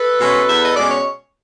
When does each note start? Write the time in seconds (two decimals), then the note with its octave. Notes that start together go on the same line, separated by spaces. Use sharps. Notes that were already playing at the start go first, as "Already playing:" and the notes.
Already playing: A4 B4
0.20 B2 G#3 C#4
0.49 E2 E5
0.64 D#5
0.76 B2 G#3 C#4 D5
0.90 C#5